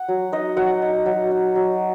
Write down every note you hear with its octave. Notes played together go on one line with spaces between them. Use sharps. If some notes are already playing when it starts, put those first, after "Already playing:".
Already playing: F#5
F#3
D#4 D#5
F#3 F#5
D#4
F#3
D#4
F#3